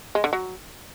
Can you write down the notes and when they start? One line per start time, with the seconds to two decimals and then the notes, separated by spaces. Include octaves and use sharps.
0.15 G#3
0.24 D3
0.33 F#3